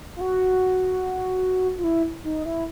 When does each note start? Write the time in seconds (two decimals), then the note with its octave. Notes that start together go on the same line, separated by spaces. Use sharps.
0.16 F4
0.21 F#4
1.78 F4
1.84 E4
2.24 D#4
2.45 E4